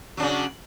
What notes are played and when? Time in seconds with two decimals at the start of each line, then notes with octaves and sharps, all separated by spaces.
0.17 F#3
0.20 D4
0.22 C#3